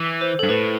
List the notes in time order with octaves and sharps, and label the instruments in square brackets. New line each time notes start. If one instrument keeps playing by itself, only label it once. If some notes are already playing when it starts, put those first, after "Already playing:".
Already playing: [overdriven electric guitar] E3
[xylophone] C5
A4
[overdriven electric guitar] G2
[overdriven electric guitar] A2 [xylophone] B4